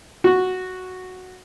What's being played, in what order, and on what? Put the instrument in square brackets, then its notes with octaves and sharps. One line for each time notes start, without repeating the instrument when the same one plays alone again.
[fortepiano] F#4